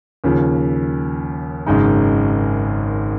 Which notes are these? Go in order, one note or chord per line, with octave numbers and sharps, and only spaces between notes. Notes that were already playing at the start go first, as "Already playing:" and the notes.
D#2 C#3 F3
G#1 F#2 C#3 G#3 D#4